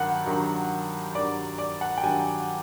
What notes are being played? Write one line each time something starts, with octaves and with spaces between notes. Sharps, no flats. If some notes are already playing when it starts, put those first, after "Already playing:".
Already playing: G2 D#3 F#3 F#5
G2 D#3 F#3
G2 D#3 F#3 D5
D5
F#5
G5
G2 D#3 F#3 G#5